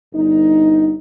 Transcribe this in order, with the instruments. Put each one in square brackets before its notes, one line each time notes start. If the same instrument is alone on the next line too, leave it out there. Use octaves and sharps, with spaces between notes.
[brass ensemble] G1 D#4